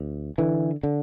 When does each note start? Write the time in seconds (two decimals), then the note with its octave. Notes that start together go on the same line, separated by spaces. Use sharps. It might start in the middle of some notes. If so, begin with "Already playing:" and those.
Already playing: D2
0.38 D3 E3
0.83 D3